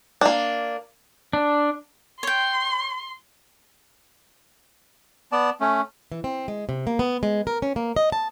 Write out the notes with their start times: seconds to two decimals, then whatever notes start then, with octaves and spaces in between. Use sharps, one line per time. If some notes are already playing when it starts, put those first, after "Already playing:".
0.21 A#3 D4
1.33 D4
2.23 C#5 G5 C6
5.32 B3 D5 A5
5.61 A3 C#4
6.12 E3
6.24 C4
6.48 G#3
6.69 C3
6.87 A#3
6.99 B3
7.23 G#3
7.47 A#4
7.62 C#4
7.76 A#3
7.96 D#5
8.12 A5